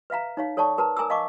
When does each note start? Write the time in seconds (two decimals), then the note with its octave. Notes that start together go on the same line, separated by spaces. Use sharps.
0.10 B4 E5 F5 A#5
0.37 D#4 C#5 F5
0.57 A4 C#5 D5 A5 C#6
0.78 A#4 B4 A5 A#5
0.97 A#4 G#5 A#5 D6 E6
1.10 D#5 F5 A5 C#6 D6